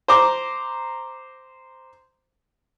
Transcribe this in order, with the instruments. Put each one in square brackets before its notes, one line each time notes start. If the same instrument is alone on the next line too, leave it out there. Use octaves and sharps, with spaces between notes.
[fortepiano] C5 A#5 D6